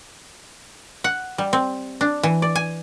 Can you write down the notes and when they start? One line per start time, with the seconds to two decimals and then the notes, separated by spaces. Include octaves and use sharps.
1.04 F#5
1.38 G3
1.53 C4
2.01 D4
2.23 E3
2.42 D5
2.55 G#5